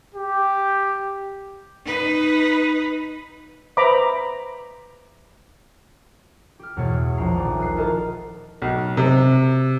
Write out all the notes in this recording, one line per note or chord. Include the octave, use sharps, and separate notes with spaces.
G4
D#4 B4
B4 C5 E5 A#5 B5 D6
G4 F6
E2 B2 G#3 C#5 A6
A#1 A#5 C7
D#1 G#3 D6
D#6 F#6 C7
E4 A4 A#4 D#5 A5
B1
C3